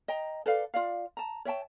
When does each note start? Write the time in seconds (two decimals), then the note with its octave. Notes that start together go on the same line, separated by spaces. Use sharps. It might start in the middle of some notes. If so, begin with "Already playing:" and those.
0.08 D#5 G5 A#5
0.46 A4 B4 D5 F5
0.74 F4 D5 F5
1.17 A5 A#5
1.45 C#5 E5 G5 A5